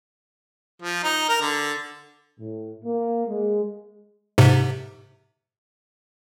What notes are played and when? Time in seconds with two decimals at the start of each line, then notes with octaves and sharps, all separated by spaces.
0.82 F3
1.03 D#4
1.29 A#4
1.41 D3
2.39 A2
2.84 A#3
3.27 G#3
4.38 G#2 C3